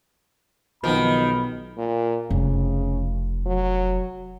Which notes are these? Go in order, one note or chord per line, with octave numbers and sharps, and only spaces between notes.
B1 D#3 F3 B3 B5
A#2
F1 C#3
F#3